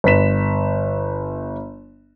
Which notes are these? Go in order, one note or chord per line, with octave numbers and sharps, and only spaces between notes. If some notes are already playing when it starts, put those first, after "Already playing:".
G1 B4 B6 E7